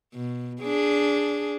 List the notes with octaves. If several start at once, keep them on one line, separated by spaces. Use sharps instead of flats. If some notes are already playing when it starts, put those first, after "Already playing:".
B2
D4 G#4